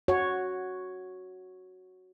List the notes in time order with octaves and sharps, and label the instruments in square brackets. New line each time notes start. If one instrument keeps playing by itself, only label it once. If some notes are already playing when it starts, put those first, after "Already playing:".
[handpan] F#4 C#5